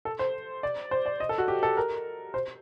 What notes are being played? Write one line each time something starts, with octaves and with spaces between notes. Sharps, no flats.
A4
C5
D5
C5
D5
D#5
A4
F#4
G4
A4
A#4
C5